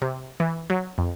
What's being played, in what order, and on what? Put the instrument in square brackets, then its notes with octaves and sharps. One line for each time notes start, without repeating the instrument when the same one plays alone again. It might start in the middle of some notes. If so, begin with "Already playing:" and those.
[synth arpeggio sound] C3
E3
F#3
F2